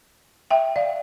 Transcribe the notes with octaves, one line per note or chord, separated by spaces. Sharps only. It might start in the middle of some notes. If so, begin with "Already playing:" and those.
E5 G5
D5 F5